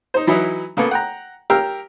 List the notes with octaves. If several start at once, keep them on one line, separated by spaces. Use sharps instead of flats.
D#4 C5
E3 F#3 D#4 E4
C#3 A#3 B3 A4
F#5 G5 A#5
G4 A#4 F5 E6